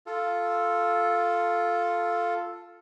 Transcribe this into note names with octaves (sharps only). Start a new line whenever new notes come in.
F4 A4